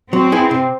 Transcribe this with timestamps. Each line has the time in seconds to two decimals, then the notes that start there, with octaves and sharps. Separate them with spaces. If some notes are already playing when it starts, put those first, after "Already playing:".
0.12 F#3 C4
0.32 B3 E4 G#4
0.51 C3